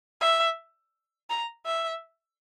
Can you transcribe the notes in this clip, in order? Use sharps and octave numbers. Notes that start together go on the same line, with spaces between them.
E5
A#5
E5